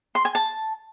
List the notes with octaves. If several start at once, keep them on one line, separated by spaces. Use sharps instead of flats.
C6
G#5
A5